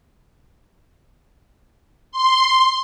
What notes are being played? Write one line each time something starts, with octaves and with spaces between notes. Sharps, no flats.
C6